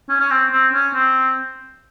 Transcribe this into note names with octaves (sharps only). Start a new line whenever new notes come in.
C#4
C#4
C4
C4
C#4
C4